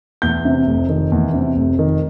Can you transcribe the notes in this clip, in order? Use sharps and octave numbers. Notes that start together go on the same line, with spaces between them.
E2 G6
C3
F1
D#3
E2
C3
F1
D#3